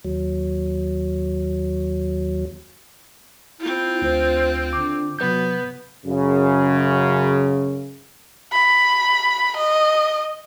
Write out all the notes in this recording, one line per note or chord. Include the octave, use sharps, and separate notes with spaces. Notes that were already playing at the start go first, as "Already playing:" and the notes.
D#2 F#3
C4 E4 F4
D2 C5
D3 D6
C3 F#3 B3 B4 G6
F#2 C#3
B5
D#5